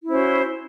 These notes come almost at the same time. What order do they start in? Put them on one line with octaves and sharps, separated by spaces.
E4 C#4 C5 F#4